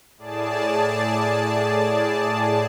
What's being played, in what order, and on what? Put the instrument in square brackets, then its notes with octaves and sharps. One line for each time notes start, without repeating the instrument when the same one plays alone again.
[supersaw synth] A2 G#4 D5 A5